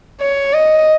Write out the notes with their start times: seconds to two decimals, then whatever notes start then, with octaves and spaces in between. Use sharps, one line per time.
0.21 C#5
0.54 D#5